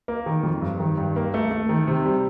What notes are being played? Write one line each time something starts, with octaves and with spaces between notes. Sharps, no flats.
A#3
D#3
F2
G2
D#3
G2
A#3
A3
A3
D#3
C3
G3